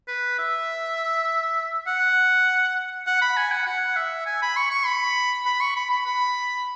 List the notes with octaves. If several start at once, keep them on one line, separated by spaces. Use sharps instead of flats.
B4
E5
F#5
F#5
B5
G#5
F#5
F#5
E5
G#5
B5
C#6
C#6
B5
B5
C#6
B5
B5
B5